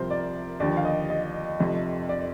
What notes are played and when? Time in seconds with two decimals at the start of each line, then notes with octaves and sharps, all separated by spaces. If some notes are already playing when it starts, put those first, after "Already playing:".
Already playing: C2 C3 F3 A#4 C5
0.10 D5
0.60 D#2 D3 F3 D5
0.77 F5
0.85 D#5
1.10 D#5
1.60 F1 F2 C3 F3
2.09 D5